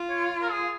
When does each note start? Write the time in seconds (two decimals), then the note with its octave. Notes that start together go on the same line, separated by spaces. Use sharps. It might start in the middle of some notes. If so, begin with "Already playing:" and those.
Already playing: F4
0.10 C#5
0.41 A#4
0.51 G#4